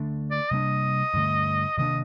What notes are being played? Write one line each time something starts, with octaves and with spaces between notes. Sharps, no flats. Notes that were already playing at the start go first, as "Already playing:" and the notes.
Already playing: D3 A3 D4
D5
C3 G3 A#3 D4 D#5
G2 D3 A3
C3 D#3 A#3 D4 D#5